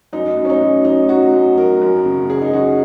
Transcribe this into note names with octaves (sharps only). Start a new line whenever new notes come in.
F#2 D#4
F#2
C#4
D#4
F#2
F#2 D#4
F#3 F#4
F#2
F#3 A#4
F#2
C#3
C#3 G#4
D#4
F#2 F#4